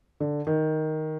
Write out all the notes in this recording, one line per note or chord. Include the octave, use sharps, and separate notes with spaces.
D3
D#3